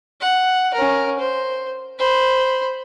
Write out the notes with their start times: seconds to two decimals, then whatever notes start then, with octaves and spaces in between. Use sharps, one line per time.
0.21 F#5
0.74 C#4 A#4
1.19 C5
1.99 C5 B5